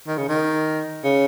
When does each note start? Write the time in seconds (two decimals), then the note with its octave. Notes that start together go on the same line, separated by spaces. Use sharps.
0.07 D#3
0.18 C#3
0.29 D#3
1.04 C#3